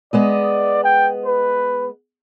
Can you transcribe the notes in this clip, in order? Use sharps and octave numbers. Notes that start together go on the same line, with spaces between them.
G#3 B3 D5 D#5
G5
B4